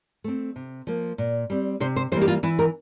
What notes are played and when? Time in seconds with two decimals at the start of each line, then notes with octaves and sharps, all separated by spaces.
0.24 A3 C4
0.56 C3
0.87 F3 A#3
1.18 A#2
1.50 G3 C4
1.80 C3 C5
1.96 C5
2.12 E3 G3 A#3 C5
2.22 G4
2.28 F4
2.43 E3 E4
2.59 A#4